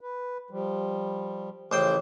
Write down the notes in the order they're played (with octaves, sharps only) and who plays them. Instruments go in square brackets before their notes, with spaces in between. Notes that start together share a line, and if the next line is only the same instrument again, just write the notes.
[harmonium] B4
F3 G3
[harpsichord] A1 C5 G5 [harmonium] C#3 E3 F3